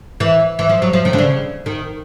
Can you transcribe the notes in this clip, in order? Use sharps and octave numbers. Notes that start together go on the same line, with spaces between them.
E3
E3
F3
F#3
F3
D#3
D3
C#3
D#3